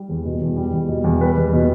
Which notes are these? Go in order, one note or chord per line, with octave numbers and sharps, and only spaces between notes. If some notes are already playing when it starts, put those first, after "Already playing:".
Already playing: G3
E2
B2
E2
G3
E2
B2
E2
G3 B4
E2
B2